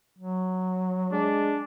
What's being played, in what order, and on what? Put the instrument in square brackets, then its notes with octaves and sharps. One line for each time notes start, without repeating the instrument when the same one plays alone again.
[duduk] F#3
[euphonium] G#3 [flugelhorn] D4